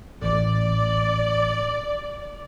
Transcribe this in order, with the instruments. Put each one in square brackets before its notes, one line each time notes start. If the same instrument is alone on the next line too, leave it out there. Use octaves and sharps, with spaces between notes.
[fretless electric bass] A1 [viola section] D5